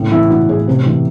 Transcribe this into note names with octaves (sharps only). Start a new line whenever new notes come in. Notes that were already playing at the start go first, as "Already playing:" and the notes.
Already playing: A2 C#3
E3 E4
E3 F#4
A2 G#4
C3
E3